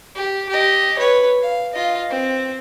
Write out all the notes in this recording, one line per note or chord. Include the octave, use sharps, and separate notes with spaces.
G4
G4 D#5
B4 C#5
F5
F4 D#5
C4